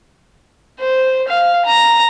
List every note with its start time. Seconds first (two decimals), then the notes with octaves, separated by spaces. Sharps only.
0.80 C5
1.28 F5
1.65 A#5